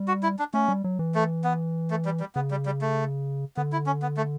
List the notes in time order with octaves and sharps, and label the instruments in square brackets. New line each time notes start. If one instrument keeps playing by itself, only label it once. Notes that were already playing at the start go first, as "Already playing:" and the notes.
Already playing: [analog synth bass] G3
[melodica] F#4
E4
D4
[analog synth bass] A3 [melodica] C#4
[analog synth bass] G3
F#3
E3
[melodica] A3
B3
A3
G3
G3
[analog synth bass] C#3 [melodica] B3
[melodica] G3
G3
A3
[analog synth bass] D3 [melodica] B3
[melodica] E4
C#4
B3
A3